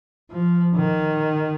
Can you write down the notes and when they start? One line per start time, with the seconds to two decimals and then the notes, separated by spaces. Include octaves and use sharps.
0.31 F3
0.76 D#3